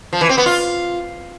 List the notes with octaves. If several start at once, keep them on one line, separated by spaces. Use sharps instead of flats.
F3
E3
C4
B3
F4